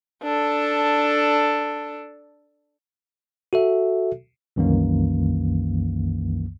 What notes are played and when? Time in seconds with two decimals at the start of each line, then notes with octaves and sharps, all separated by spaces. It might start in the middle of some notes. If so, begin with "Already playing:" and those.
0.23 D4 A4
3.53 F#4 A4 E5
4.56 C2 F#2 D#3 E3 A#3